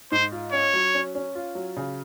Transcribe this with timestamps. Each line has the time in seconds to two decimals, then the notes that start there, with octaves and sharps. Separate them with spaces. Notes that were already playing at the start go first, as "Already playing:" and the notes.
0.12 G#2 C5
0.32 F4
0.52 C#4 C#5
0.74 F#3
0.94 C#4
1.15 C#4
1.35 F4
1.55 F#3
1.77 C#3